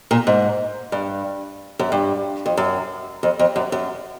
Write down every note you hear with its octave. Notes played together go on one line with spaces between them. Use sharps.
A#2
G#2
G2
F#2
G2
F2
F#2
F2
F2
F#2
F#2